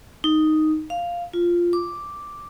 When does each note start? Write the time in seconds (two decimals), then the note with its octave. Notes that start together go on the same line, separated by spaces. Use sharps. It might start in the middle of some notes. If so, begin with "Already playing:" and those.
0.24 D#4
0.90 F5
1.34 F4
1.73 D6